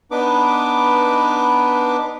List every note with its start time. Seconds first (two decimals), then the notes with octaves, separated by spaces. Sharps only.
0.11 B3 D4 D#4 B4 D6